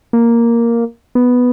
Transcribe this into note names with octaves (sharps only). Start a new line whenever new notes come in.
A#3
B3